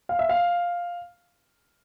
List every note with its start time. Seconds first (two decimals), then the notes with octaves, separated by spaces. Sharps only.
0.09 F5
0.19 E5
0.29 F5